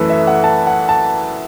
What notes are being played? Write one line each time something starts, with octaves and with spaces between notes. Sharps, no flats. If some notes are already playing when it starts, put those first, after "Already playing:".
Already playing: F#2 E3 A3 A4 B4
E5
F#5
A5
F#5
A5